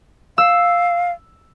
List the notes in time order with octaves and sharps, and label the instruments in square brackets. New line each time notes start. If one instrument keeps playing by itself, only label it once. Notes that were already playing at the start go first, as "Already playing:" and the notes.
[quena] F5 [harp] E6